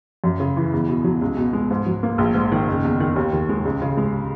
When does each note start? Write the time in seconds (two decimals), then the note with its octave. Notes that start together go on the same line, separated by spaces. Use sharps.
0.24 F#2
0.40 C#3
0.57 E3
0.73 E2
0.89 B2
1.04 F#3
1.21 C#2
1.37 B2
1.53 G#3
1.71 G#2
1.86 F#3
2.03 A#3
2.18 A#1
2.35 G#2
2.52 D#3
2.67 F#1
2.85 E2
3.00 D#3
3.16 D#2
3.33 D#3
3.49 G#3
3.65 C#2
3.82 C#3
3.97 G#3